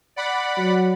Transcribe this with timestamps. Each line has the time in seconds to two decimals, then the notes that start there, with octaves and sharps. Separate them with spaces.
0.16 D5 F#5 B5
0.57 F#3